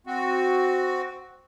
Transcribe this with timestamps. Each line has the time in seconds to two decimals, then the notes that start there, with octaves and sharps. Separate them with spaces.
0.07 C4 F#4